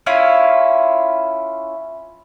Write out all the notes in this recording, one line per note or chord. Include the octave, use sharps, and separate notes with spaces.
C#4 E4 F4